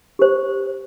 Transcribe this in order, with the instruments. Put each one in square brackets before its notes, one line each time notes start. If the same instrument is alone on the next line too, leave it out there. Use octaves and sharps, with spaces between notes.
[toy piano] G4 C5